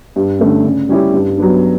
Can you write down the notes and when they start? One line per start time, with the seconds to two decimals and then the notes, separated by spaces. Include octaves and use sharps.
0.16 G2
0.39 D3 A3 C#4
0.65 C#3
0.89 G3 C#4 E4 G4
1.13 G2
1.38 F#3 B3 D4